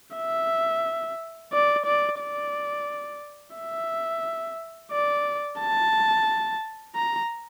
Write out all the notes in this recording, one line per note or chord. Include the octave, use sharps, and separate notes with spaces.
E5
D5
D5
D5
E5
D5
A5
A#5